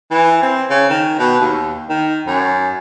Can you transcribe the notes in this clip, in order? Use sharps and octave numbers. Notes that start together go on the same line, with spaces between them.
E3
C4
C#3
D#3
B2
D#2
D#3
F#2